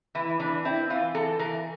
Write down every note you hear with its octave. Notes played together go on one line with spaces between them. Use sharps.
E3 E4
E3 D4
C4 E4
E3 F4
E3 A4
E3 A#4